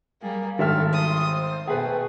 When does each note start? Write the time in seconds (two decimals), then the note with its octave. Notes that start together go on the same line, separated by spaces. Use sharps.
0.22 G3 A#3 G#4
0.59 G#1 A4 E5 F6
0.93 C6 D#6
1.30 C5
1.67 B2 A3 G#4 B4 G5